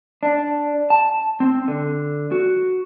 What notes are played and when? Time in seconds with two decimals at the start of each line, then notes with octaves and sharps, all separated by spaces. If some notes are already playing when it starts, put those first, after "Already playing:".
0.23 D4
0.90 A5
1.40 C4
1.68 D3
2.32 F#4